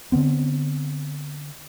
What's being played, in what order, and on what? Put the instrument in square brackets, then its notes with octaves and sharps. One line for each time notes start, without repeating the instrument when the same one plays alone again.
[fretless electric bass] D3 F3 B3 C4